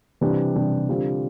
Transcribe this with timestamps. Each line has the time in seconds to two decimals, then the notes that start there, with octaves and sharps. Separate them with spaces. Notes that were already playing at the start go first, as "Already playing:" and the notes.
0.21 C3 E3 G3 D4 G4
0.55 C3 E3 G3 D4 G4
0.89 D3 G3 C4 F4